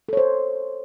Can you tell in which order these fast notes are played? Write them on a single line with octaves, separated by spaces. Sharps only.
A4 C#5 C5